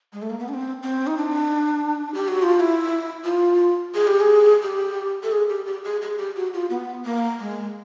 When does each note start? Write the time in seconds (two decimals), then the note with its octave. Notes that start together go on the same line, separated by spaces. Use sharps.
0.13 G#3
0.22 A3
0.30 A#3
0.39 B3
0.49 D4
0.54 C4
0.83 C4
1.07 D#4
1.17 D4
2.14 G4
2.28 F#4
2.42 F4
2.56 F4
2.60 E4
3.24 F4
3.95 G#4
4.07 G4
4.20 G#4
4.63 G4
5.24 A4
5.32 G#4
5.49 G4
5.66 G4
5.84 G#4
6.02 G#4
6.18 G4
6.36 F#4
6.54 F4
6.70 B3
7.05 A#3
7.40 G#3